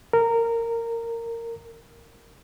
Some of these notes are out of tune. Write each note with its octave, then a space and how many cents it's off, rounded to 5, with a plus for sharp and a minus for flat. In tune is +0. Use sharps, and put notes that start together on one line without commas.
A#4 -15